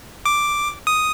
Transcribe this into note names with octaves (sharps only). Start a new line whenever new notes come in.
D6
D#6